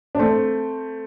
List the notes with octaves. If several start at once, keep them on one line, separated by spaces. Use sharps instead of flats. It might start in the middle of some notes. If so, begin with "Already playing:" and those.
D4
A3 C4